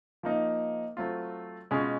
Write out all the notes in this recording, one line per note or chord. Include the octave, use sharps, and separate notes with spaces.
F3 A#3 D#4
F#3 A3 C4 F4
B2 G#3 C#4 F4